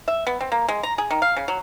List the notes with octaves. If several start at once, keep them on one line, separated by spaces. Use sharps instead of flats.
E5
B3
C4
A#3
G#3
A#5
G#4
D#3
F5
C#3
F#3